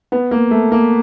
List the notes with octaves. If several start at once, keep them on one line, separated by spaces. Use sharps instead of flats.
B3
A#3
A3
A#3